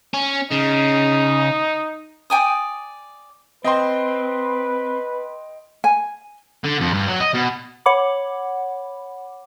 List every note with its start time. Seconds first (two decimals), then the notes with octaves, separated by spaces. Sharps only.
0.14 C#4
0.52 C#3 D#4
2.30 D5 G5 G#5 D#6
3.64 C4 B4 D#5 G5 C6
5.84 G#5
6.64 D3
6.80 F2
6.94 G2
7.08 F#3
7.20 D#5
7.34 B2
7.86 C#5 F#5 B5 D6